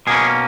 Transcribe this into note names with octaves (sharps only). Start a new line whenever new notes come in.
B2 A#3 C#4 G#4